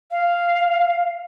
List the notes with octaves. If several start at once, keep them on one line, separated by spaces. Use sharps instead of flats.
F5